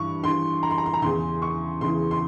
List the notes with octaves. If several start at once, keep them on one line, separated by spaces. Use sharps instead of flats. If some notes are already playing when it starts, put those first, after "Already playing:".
Already playing: G2 E3 C#6
G2 E3 C6
A#5
C6
A#5
C6
A#5
E2 C#3 E3 C6
C#6
E2 C#3 E3 C6
C6